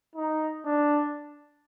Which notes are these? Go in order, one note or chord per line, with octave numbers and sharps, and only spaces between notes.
D#4
D4